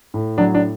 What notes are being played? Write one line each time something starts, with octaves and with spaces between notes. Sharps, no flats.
A2
F#3 D4
D4